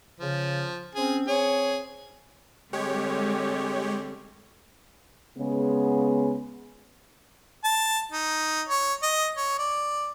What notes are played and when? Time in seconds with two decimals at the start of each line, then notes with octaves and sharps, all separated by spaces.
0.20 C#3 F3
0.95 C4 C#4 G#4
1.28 C4 G#4 C#5
2.73 D3 G3 G#3 C4 G4 C#5
5.38 C#3 G#3 B3
7.64 A5
8.12 D#4
8.69 C#5
9.02 D#5
9.37 C#5
9.58 D5